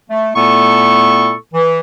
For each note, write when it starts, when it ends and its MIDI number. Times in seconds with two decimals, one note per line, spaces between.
0.10 0.29 57
0.35 1.33 46
0.35 1.33 57
0.35 1.33 59
0.35 1.33 64
0.35 1.33 69
0.35 1.33 85
1.54 1.80 52